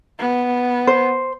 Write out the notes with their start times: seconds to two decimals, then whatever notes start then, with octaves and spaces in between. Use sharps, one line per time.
0.19 B3
0.87 C5